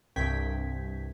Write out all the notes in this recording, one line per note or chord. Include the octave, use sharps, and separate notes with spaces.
C2 G2 G5 G#6 B6